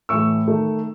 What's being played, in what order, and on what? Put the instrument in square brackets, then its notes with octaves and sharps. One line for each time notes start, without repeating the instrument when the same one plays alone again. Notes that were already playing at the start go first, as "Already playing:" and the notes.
[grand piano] A2 E3 A3 C#6 E6
D#3 A3